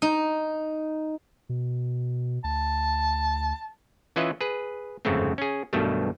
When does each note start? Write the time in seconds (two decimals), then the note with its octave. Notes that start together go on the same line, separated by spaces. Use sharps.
0.02 D#4
1.49 B2
2.44 D2 A5
4.16 E3 C#4 F4 B4 D#5 E5
4.41 G#4 B4
5.05 G1 F2 G#2 C#3 A3 C4
5.38 C#4 G#4
5.73 B1 G2 B2 D#3 G3 A3